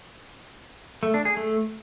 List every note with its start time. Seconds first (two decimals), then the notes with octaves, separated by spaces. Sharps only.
1.03 A3
1.14 D4
1.25 G#4
1.37 A3